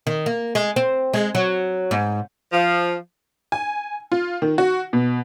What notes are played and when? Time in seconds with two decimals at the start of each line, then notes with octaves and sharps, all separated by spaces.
0.07 D#3
0.26 A#3
0.55 G#3
0.76 C4
1.14 G#3
1.35 F#3
1.91 G#2
2.52 F3
3.52 G#5
4.12 F4
4.42 D#3
4.58 F#4
4.93 B2